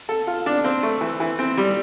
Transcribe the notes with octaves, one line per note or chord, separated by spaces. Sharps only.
A4
F4
D4
C4
A3
E3
E3
C4
G3